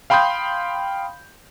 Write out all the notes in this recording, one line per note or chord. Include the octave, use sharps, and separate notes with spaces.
F5 G5 B5 C6 D#6 G6